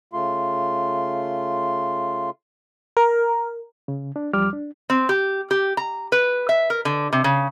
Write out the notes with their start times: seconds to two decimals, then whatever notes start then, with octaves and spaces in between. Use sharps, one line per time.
0.13 C#3 A3 F4 C6
2.97 A#4
3.88 C#3
4.16 D4
4.33 E2 F3 G3 D6 F6
4.53 D4
4.90 C4
5.09 G4
5.51 G4
5.77 A#5
6.12 B4
6.49 E5
6.70 A#4
6.85 D3
7.13 C3
7.24 C#3